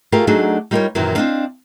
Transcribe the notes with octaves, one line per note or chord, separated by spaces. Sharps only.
A3 F4 G4 G#4 A#4 F5
F#3 A3 D4 D#4 F#4 G#4
G3 D#4 F4 G#4 A#4 C#5
F#2 A#2 D#3 E3 F#3
C4 D4 D#5 F5